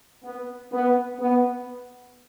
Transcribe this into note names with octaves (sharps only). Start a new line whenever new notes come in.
B3
B3
B3